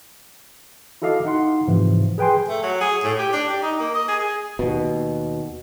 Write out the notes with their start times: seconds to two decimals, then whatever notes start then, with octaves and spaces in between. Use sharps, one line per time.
1.02 E4 F#4 A4 D#5 F5 D6
1.25 D#4 F#5 C6
1.67 G#2 C3 E3 F3
2.18 G#4 B4 G5 G#5 C6
2.48 A3
2.63 F#3
2.81 G#4
3.03 A2
3.18 G4
3.33 D4
3.49 G4
3.62 D#4
3.80 A#3
3.94 D#5
4.08 G#4
4.20 G#4
4.59 D#2 B2